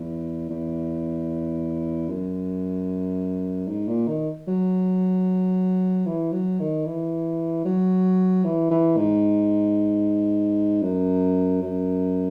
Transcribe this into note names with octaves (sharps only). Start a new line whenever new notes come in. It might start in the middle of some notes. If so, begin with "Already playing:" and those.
Already playing: E2
E2
F#2
G#2
A#2
D#3
F#3
E3
F#3
D#3
E3
F#3
E3
E3
G#2
F#2
F#2